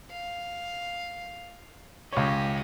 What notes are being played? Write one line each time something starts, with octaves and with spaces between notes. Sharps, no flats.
F5
C#2 G4 C#5 D#5